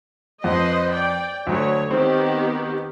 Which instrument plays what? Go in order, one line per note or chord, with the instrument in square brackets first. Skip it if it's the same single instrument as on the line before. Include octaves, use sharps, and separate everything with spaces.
[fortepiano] F2 [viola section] B4 C5 D#5
[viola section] D5 G5
[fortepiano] D2 F#3 [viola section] A3 C#5
[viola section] D#3 B3 G4 [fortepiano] C4